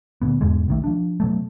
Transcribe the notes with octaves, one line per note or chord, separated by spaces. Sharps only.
D2 A#2 B3
E2 G#2 B2 G#3
B1 D#3 A3
F3 D4
B2 F#3 A3